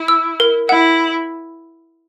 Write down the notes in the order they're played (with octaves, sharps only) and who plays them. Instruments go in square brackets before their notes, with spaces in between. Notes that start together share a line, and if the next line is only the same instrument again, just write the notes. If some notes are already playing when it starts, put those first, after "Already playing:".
Already playing: [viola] E4
[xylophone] E6
A#4
[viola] E4 [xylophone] F#5